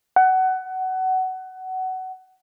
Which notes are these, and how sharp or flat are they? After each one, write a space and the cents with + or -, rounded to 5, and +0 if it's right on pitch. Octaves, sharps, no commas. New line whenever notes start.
F#5 +20